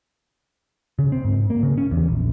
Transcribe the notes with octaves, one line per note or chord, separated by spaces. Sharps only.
C#3
C4
G#2
A#3
C#3
C#4
E2
A#1